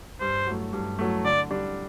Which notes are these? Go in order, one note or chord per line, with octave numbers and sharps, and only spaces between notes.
G2 C5
F#3 A3
G2
F#3 A3
D3 D5
G3 D4